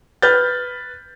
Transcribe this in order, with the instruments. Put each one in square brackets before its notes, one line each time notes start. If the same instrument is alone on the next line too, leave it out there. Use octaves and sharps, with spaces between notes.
[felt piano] B4 F6 G6 A6